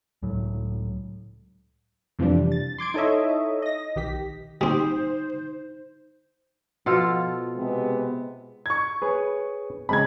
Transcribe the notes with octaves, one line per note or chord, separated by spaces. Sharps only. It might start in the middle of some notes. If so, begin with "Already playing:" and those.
C#2 A2 F#3
F2 C3 E3 F3 G3 D4
A6
C6 D6 G#6 D7
D#4 E4 A4 C#5 D#5 E5
D#5 A#6
B1 D#3 G4 B6
G3 C4 D#4 C5
B2 F3 F4 A4
C3 G#3 B3
C#6 G#6
G#4 B4 C#5
C#3 G#3 C4 B5 G#6